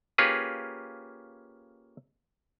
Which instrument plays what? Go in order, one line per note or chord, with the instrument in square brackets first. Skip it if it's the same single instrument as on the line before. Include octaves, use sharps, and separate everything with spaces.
[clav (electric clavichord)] A#3 C#4 F4 G4 G#4 B4